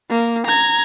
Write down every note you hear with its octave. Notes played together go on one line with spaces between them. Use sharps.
A#3
A#5 G#6